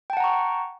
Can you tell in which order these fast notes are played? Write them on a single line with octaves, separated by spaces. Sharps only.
G5 A5 F#5 A#5 C#6